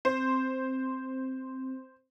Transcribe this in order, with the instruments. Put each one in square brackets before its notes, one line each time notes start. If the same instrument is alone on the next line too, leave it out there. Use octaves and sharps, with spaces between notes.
[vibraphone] C4 [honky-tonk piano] C5